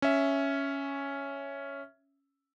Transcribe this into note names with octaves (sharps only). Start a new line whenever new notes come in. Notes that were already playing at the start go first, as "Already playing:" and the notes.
C#4 E5